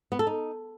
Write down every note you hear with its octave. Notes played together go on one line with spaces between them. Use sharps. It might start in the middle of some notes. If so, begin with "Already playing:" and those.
B3
A4
D#4